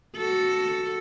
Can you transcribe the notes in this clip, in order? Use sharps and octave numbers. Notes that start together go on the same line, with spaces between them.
F#4 A4